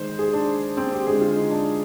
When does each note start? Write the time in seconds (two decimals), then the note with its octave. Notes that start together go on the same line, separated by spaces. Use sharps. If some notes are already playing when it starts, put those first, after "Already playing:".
Already playing: D#3 G#3 C5
0.19 G#4
0.33 D4
0.77 C4
0.92 G4
1.07 D3 G#3 G#4
1.21 F4
1.36 D#4
1.50 D4